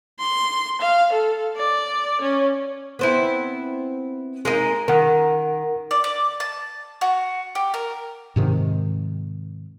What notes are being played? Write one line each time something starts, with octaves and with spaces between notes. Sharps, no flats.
C6
F5
A4
D5
C#4
B3 C4 E4
G#3 A#3 D#4
D#3 A#4 F#5
D5
D5
A5
F#4
G4
A#4
G#2 C3 D#3